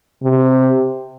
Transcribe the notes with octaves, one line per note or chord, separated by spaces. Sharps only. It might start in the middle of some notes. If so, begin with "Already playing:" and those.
C3